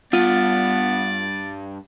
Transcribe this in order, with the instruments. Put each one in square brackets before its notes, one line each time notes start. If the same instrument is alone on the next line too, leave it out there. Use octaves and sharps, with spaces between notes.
[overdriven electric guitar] G2 [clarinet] B3 [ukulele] F4 [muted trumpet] D5